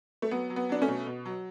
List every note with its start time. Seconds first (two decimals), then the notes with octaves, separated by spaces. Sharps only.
0.22 A3
0.31 F#3 B3
0.50 F#3
0.56 B3
0.69 F#3 D4
0.82 A3 C#4
0.88 B2
1.07 B2
1.25 F#3